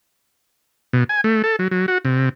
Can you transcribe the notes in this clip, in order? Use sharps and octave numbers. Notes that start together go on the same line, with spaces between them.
B2
G#5
A3
A4
F#3
F#3
F#4
C3